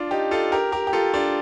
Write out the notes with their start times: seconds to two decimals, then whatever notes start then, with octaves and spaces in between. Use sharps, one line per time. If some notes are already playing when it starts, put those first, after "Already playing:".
Already playing: D4 F4
0.11 D#4 G4
0.31 F4 A4
0.52 G4 A#4
0.72 G4 A#4
0.87 G4
0.93 F4 A4
1.14 D4 F4